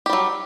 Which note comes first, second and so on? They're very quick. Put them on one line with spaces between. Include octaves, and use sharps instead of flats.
G4 G3 F#3